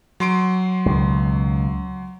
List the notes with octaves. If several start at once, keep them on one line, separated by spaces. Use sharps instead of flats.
F#3 C6 D7
C#2 B2